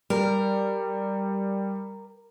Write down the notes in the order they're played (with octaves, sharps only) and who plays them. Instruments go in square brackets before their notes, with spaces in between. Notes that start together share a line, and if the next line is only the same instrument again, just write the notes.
[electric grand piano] G3 [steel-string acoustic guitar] A#4